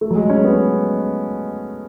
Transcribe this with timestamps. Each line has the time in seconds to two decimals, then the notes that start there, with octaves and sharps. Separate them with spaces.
0.01 A3
0.11 F#3
0.15 G#3
0.30 C#4
0.45 B3